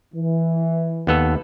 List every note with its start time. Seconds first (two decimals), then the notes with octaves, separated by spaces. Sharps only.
0.13 E3
1.07 D#2 B3 A4